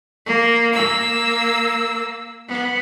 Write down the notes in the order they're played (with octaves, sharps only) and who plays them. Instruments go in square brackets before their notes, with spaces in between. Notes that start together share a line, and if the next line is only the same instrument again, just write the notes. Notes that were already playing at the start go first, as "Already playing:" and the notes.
[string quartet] A#3
A#3 E6
B3